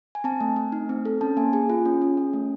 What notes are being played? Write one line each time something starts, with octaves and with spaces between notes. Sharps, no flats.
G#5
C4 A5
A3
A3
D#4
C4
A4
C#4 A5
A#3 G#5
G#4 G#5
F4
C#4
C#4
C#4
A3